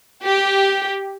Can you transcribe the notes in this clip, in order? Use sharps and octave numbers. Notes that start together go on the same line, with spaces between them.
G4